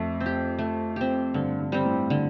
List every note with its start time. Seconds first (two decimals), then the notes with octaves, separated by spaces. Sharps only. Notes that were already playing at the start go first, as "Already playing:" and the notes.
Already playing: F2 A3
0.21 C4
0.26 G4
0.59 A3
0.96 C4 G4
1.34 G2 D3
1.60 G2
1.72 G3 C4
1.85 A2
2.10 D3